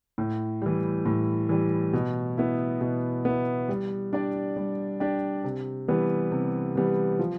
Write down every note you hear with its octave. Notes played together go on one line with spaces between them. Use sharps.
A2
E3 G3
A2
E3 G3
B2
B3 E4
B2
B3 E4
G3
D4 G4 D5
G3
D4 G4 D5
C3
E3 G3 B3
C3
E3 G3 B3
F3